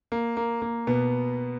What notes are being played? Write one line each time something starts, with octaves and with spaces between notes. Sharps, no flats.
A#3
A#3
A#3
B2 B3